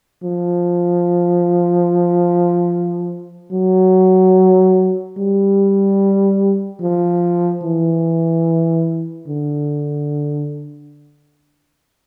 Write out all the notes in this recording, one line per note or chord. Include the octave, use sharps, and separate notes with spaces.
F3
F#3
G3
F3
E3
D3